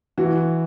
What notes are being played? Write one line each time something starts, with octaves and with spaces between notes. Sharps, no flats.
E3 F#4